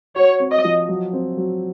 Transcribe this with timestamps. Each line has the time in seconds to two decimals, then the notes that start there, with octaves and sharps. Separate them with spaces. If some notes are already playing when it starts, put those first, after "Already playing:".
0.16 F#4 C#5
0.40 C4
0.53 D#5
0.64 F3
0.88 F#3
1.13 C4
1.37 F#3